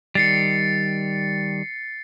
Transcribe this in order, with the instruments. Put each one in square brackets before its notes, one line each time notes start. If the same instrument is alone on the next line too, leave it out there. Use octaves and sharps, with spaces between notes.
[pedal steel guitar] D#3 G3 [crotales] A6 C7 C#7